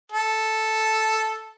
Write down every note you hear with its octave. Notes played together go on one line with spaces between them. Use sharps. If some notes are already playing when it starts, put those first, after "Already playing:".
A4